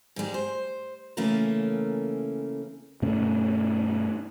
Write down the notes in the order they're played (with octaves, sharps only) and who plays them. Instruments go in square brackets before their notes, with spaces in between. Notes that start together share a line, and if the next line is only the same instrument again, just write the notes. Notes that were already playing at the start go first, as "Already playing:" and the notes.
[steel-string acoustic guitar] G#2 G3 G#3 G4
C5
C#3 E3 A3 A#3 C#4 A#4
[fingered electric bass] G2 B2 A3 C#4